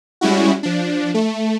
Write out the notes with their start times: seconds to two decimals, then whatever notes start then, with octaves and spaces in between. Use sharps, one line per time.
0.21 G3 G#3 C#4 E4 F#4
0.63 F3 D4
1.14 A3